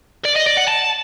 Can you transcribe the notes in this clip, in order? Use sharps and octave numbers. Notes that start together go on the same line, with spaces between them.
D5
D#5
D5
F#5
A5